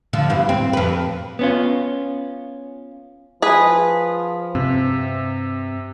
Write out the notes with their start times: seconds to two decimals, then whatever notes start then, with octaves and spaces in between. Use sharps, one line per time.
0.13 D3 F3
0.30 E2 G2
0.49 C4
0.73 F2 B4
1.39 B3 C#4 F4
3.42 F3 G#4 B4
4.55 G2 C3 C4